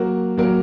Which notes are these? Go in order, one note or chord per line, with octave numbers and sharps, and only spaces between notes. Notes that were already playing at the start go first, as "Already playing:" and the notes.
Already playing: F#3 A#3 F#4 A#4
F#3 A#3 F#4 A#4